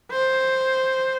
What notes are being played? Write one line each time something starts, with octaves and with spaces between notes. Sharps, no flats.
C5